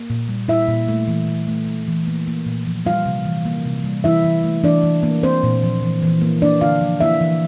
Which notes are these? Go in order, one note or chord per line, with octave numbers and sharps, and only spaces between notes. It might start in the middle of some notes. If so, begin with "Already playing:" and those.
Already playing: A#3
A#2
G3
A#2 E4 E5
A#2
A3
E3
E3
A3
E3
E3
A#3
A#3
A#2
F3
G3 F4 F5
C3
E3
A#3
C3
G3
E3 E4 E5
E3
A3
E3 D4 D5
E3
A#3
A#3 C4 C5
A#2
F3
E3
E3
A#3
A#3 D4 D5
D3 F4 F5
F3
A#3 E4 E5
E3